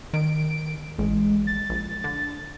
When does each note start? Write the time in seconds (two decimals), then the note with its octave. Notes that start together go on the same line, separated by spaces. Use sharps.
0.13 D#3 D7
0.98 A1 G#3
1.47 A6
1.70 A#1
2.04 D3